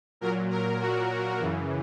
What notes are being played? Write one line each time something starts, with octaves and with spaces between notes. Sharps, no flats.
A#2 F#3 A#4
A#4
F#4
F#2 C#3 E3